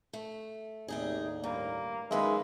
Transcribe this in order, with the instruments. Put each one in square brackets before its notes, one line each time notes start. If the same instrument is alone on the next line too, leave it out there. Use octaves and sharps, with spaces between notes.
[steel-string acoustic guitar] A3
[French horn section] D#2 A2 D5 [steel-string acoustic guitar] C3 D#4 G#4
[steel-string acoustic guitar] G2 [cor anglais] A#3
[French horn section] E2 D#3 F#3 [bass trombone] G#3 [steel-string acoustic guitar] A#3 C#4 B4 [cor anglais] E5